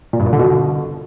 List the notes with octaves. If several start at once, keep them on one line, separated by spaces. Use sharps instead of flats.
A#2
G2
A#2
D3
B2